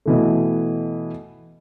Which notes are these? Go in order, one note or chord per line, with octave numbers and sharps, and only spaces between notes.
B2 E3 A3